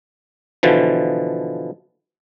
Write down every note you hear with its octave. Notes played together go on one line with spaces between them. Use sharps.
B2 D3 E3 F3